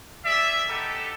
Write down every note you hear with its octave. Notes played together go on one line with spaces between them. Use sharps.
G#4 D5 E5
B3 D#4 G4 A4